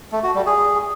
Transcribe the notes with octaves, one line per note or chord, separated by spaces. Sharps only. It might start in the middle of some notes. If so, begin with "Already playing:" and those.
A3
F#4
G3
G#4